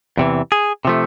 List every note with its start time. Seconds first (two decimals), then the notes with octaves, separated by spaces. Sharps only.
0.17 E2 C3 E3
0.52 G#4
0.85 C3 F3 A3